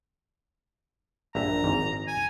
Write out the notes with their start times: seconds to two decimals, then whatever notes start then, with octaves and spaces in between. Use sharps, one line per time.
1.35 A#1 G2 E5 A#5
1.64 G#1 G#2
2.07 G#5